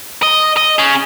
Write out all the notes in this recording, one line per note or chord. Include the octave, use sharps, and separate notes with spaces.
D#5
D#5
C#4 G#4